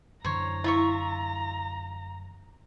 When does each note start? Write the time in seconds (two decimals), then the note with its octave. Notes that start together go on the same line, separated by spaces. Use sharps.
0.24 F#2 D3 E3 C5 C#5 A#5
0.64 E4 F4 E5 C#6